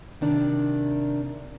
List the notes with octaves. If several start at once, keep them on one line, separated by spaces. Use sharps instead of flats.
C3 D#3 D4